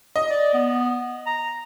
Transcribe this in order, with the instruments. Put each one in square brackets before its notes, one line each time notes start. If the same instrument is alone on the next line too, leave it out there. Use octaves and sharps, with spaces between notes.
[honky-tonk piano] D#5
[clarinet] D5
B3
A#5